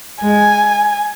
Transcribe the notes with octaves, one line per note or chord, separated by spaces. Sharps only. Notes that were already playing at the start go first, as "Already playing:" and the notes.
G#3 G#5